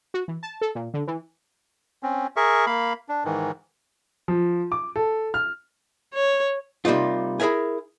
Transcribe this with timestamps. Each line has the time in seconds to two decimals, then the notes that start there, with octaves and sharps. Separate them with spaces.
0.14 F#4
0.28 E3
0.43 A5
0.61 A4
0.75 A#2
0.94 D3
1.07 E3
2.03 C4 C#4
2.36 G#4 A#4 E5 C#6
2.67 A#3 F5 B5
3.09 D4
3.25 G#2 D#3 E3
4.28 F3
4.72 D6
4.96 A4
5.34 F6
6.14 C#5
6.85 C3 G3 A#3 D#4 F4
7.40 E4 G#4 A#4 E5 G#5